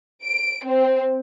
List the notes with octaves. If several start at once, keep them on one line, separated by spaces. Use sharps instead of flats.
D7
C4